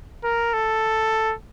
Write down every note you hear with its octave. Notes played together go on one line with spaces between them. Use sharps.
A#4
A4